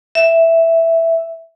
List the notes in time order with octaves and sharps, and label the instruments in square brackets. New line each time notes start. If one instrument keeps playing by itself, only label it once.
[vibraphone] E5